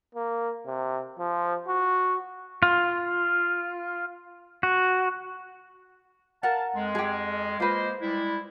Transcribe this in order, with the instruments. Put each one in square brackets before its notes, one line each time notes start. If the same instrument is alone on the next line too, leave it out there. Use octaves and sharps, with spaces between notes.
[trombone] A#3
C3
F3
F#4
[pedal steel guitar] F4
F#4
[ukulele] A#4 F#5 [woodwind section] F5 A5
[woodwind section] F2 G#3
[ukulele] G4 G#4
[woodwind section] G#3 A#3 C5 [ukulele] F4 B4
[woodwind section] G3 G#3 E4